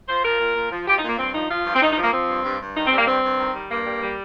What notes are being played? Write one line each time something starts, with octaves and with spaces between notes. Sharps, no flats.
F3 C5
F3 A#4
A#2
A#2
F3
F3 G4
D#4
A#2
A#3
G2 C4
F3 D#4
F3 F4
G2
C4
G2 D#4
D#4
F3
A#3
F3 C4
G2
G2
G2
D#3 D#4
C4
G3
A#3
G2 C4
G2
D#3
G3
G2 A#3
G3
G3